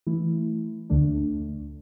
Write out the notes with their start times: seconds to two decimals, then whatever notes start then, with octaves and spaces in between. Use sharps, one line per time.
0.07 E3 A3 E4
0.90 D2 D3 A3 D4